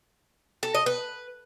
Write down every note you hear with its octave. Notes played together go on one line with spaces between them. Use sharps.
A4
D#5
B4